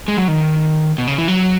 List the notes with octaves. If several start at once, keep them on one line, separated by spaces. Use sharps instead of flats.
G#3
F#3
D#3
B2
C#3
E3
F#3